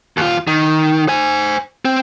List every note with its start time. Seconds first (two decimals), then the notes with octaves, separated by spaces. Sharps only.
0.17 D#2 F4
0.47 D#3
1.08 C5 G#5
1.85 C4